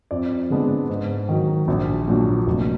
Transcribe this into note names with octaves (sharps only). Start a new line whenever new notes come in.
F2 D5
D3 G#3 B3 D4
G#2
D#3 F#3
A#1
A#2 F#3 D4
F1